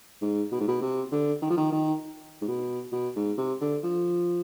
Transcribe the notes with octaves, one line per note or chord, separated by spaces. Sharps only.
G#2
B2
G#2
B2
C3
D3
D#3
F3
D#3
D#3
G#2
B2
B2
G#2
C3
D3
F3